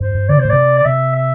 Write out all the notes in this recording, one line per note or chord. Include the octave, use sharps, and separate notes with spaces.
G2 C5
G2
D3 D5
C3 C5
A2
C3 D5
D5
C3 E5
E5